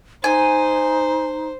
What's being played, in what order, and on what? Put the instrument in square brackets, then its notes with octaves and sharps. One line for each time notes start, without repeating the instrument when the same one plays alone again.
[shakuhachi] D#4 [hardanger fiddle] C5 [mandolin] G#5